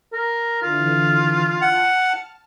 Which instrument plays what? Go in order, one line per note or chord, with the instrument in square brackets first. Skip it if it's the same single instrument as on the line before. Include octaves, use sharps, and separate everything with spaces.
[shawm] A#4
[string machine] D3 E3 [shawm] F4
[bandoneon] F#5 [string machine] A5 F6